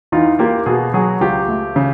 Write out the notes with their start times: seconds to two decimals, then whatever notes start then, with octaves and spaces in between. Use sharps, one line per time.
0.12 E2 D#4 F4
0.39 A#3 F4 G4
0.66 B2 F#4 G#4
0.94 F#3 F#4 G#4
1.21 C#2 F4 G4
1.48 A3
1.76 C#3